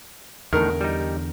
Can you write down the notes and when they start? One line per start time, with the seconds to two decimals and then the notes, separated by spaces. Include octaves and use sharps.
0.53 E2 A2 D3 D#3 A#4
0.81 G3 D#4